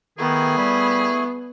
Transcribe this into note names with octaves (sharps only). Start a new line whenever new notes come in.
D#3 A3 B3 E4 G#4
G3